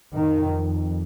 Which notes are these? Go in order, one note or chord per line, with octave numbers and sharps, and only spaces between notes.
F2 D#3